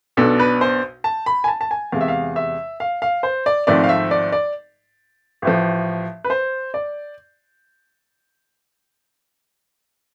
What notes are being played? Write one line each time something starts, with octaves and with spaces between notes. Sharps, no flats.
B1 B2 B3 D4 A4
B4
C5
A5
B5
G#5
A5
A5
G#5
E2 C3 G#3 F5
E5
F5
E5
F5
F5
C5
D5
G#1 G#2 F3 A3 C4 D5
F5
E5
D5
D5
A1 A2 F3
B4
C5
D5